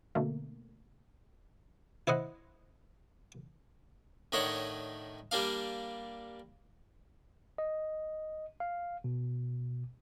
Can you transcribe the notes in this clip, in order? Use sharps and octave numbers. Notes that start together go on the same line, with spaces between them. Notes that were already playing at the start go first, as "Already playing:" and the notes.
B2 D3 A3 A#3
E4 C5 D#5 F#5
A2 D#3 D4 D#4 C#5 F#5
G3 A#3 D4 F5
D#5
F5
B2